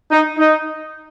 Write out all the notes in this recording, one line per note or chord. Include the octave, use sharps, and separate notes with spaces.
D#4
D#4